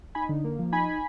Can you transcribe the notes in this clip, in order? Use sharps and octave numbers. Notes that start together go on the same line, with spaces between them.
D#4 G#5 B5
D3
A#3
F3
D#4 G#5 B5